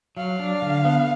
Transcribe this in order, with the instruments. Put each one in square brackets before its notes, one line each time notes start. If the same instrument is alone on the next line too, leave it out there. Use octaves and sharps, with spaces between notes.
[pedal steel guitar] F#3 [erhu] F5
[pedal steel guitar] D4
D3
B3